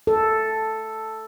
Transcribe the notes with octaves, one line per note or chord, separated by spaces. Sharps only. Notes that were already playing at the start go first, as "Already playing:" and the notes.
A4